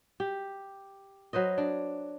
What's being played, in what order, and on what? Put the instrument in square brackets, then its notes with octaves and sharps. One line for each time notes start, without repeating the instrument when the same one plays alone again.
[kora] G4
F#3 B4 C5 D#5
D4